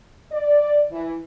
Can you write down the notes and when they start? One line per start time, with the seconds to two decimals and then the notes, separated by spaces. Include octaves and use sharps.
0.32 D5
0.90 E3